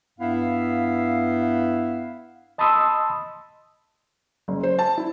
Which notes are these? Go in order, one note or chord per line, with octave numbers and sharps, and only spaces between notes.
G2 B3 E4 E5 F5
D#5 A5 B5 C6 D#6 E6
F#1
C5
A5
E4